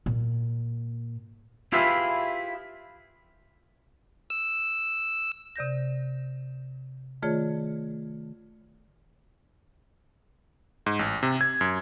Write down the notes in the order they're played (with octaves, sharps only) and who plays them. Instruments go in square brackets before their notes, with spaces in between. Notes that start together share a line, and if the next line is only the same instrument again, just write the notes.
[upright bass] A#2
[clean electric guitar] E4 F4 G4 G#4 B4 E5
[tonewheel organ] E6
[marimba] C3 D5 G6 A#6
D#3 A3 F4 G#4 C#5 D5
[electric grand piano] G#2
A1
C3
G#6
F#2